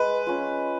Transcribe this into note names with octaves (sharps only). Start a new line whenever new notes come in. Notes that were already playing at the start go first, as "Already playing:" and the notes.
Already playing: G#3 B4
C#4 F4